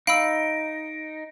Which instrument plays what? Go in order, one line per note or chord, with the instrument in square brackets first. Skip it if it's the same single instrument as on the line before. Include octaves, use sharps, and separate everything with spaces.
[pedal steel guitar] D#4 [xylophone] F5 B5 E6 [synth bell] D7